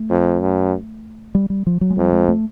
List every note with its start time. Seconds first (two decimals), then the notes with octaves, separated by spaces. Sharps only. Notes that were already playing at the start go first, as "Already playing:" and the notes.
Already playing: A3
0.10 F2
0.41 F#2
1.35 G3
1.50 G3
1.67 F3
1.81 F#3
1.90 G#3
1.97 F2 G3
2.13 G#3
2.29 A3